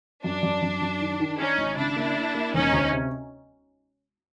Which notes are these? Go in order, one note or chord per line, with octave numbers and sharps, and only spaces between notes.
F#2 D4
F#2
F#2
F#2
D#3
D#3
D#3 C#4 D#4
G#1
C#3 D4 E4
A#3
A#3
A#3
E1 C#4 D#4
D2
C3